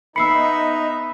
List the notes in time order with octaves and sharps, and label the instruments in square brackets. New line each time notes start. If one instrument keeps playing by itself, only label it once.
[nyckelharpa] B3 E5 [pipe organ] D#4 [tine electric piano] B5 [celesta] E6 C7 C#7